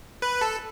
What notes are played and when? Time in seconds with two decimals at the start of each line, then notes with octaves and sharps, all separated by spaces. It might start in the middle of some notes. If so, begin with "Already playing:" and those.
0.22 B4
0.41 A4